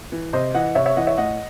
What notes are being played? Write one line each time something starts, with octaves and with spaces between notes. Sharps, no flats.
E3
C3 C5 D#5
E3 D#5 F#5
C3 C#5 E5
C#5 E5
E3 D#5 F#5
C#5 E5
A2 D#5 F#5